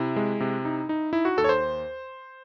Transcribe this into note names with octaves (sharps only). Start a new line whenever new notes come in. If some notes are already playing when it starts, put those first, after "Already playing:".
Already playing: C3 E4
G#3
C3
D#4
D#4
D#4 E4
F#4
D#2 A4
C#5
C5